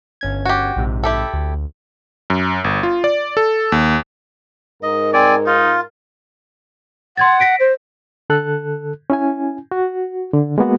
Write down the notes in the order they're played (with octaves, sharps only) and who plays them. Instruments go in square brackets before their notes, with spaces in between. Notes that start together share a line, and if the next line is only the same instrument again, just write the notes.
[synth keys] G1 C#4 G#6
[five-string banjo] F#4 G4
[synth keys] A#1 G#2 C3
[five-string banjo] E4 G4 A4
[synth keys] D2
[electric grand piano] F#2
G1
F4
D5
A4
D#2
[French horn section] G#2 A#4 [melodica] D#5
[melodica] C4 G#5 [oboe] D5
[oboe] D#4 [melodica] F4
[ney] F#5 [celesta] C6 G#6 A6
[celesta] A#6 B6 D7
[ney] C5
[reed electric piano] D3 A4 F#6
C#4 E4 G#5
F#4
D3
G#3 A#3 B3 F#4